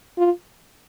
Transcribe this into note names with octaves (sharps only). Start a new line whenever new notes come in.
F4